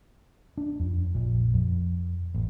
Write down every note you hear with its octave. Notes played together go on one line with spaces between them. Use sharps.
D4
F2
A#1
F2
A1